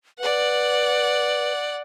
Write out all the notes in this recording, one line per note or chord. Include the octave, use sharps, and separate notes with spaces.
B4 D5 F#5